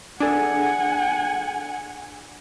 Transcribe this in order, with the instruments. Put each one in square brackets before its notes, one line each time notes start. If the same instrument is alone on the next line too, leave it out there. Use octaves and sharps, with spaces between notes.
[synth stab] D4 G#4 A4 [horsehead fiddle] F#5 G#5